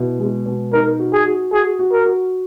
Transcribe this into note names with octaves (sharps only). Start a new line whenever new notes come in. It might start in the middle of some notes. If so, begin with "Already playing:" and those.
Already playing: B2 E4
G#3
B2
D#4 A#4
F#4
G#4
F#4
F#4 G#4
F#4
A#4
F#4